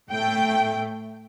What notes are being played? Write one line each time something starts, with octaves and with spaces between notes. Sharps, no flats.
A2 A3 G5